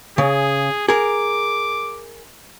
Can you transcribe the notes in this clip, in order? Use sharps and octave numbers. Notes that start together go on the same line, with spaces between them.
C#3 G#4
G#4 A#4 D6